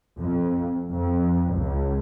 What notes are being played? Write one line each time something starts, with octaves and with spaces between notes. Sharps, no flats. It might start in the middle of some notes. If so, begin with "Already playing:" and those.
F2
F2
C#2